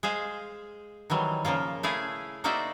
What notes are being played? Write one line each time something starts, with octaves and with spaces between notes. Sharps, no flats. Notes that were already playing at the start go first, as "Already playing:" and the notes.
G#3 G#4 C5 F5
D#3 E3 F#3 G3
C#3 F3 A#3 F4
A3 E4 G#4 F5
A#3 D#4 F#4 C5 D5 E5